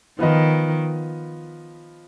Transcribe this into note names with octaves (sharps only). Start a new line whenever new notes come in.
D#3 F3 B3 F4 B4 D#5